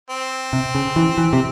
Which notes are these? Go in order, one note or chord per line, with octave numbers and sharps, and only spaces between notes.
C4
C3
C#3
E3
E3
C3